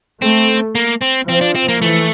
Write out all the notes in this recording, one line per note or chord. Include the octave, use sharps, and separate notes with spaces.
A3 C4
A#3
C4
F3 C4
D4
C4
A#3
E3 A3